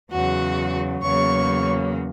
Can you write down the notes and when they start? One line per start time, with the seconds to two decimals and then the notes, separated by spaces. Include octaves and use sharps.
0.11 E2 C#3 F#3 F#4 F#5
1.03 E2 C#3 F#3 A#3 C#5 C#6